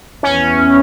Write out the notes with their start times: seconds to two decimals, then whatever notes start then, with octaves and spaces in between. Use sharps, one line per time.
0.23 E2 E3 B3 C#4